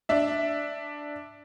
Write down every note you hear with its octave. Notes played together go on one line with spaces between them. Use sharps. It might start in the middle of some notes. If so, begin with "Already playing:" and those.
D4 E5